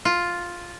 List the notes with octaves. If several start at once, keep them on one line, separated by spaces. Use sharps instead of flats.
F4